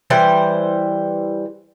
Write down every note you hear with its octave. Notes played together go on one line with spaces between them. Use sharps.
E3 G3 C5